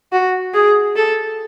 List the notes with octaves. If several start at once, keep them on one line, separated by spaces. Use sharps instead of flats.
F#4
G#4
A4